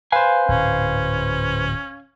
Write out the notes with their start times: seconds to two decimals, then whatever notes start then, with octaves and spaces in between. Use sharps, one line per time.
0.12 B4 C5 F5 G#5
0.49 D1 G#2 C#4